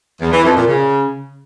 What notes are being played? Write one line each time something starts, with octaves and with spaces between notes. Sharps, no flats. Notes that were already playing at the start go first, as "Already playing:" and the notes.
E2
E3
F2
A#2
C#3